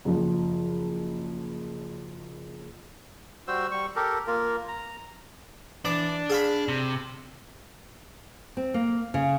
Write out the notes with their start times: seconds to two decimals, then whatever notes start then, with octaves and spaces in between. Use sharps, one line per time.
0.05 F#1 F3
3.48 G3 F#4 C5 E6
3.71 G3 C#6
3.96 G4 A4 A#4
4.27 A#3 F4 A#4
4.68 A#5
5.85 E3 D4 D6
6.30 G#4 F5 B5
6.68 C3
8.57 C4
8.74 A#3
9.14 C#3